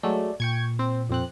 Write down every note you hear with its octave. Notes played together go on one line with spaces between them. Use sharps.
F#3 G#3 A3 D5
A#2 G5 C#6 G#6
C4
F2 C4 F#6